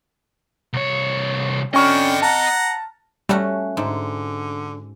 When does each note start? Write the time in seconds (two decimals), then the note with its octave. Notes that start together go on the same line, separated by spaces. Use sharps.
0.73 C2 C#5
1.74 D3 C#4 D4 D#5 G5 B5 C#6 F6
2.22 F#5 A5 A#5
3.29 G3 A3 C#4 F#4
3.77 G#2 D3